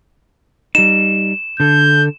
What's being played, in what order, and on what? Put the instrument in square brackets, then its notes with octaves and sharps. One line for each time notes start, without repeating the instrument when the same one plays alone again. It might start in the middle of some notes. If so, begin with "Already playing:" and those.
[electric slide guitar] G3 D#4 [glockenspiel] E7
[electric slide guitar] D3 A4 [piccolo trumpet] G6